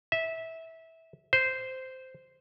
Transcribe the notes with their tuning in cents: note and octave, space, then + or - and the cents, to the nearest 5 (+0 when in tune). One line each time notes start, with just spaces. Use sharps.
E5 -20
C5 -10